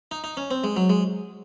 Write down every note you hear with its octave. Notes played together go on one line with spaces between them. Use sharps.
D#4
D#4
C#4
C4
G#3
F#3
G#3